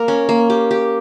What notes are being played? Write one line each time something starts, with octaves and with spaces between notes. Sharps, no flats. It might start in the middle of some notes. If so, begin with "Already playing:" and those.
Already playing: A#3 A#4
C#4
A#3
G4
G4